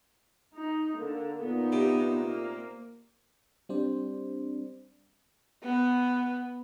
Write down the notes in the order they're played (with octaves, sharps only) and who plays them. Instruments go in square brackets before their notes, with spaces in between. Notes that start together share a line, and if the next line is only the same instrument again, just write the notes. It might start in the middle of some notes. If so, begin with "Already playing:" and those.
[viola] D#4
[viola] D3 [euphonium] A#3
[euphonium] A#2 [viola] B3 D#4
[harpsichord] C3
[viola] A#3
[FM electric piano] G3 C4 D4 C5 D5
[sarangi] B3